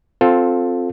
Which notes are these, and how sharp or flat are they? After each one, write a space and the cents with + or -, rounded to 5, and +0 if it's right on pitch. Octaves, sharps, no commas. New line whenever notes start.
C4 +0 F4 +15 A4 +0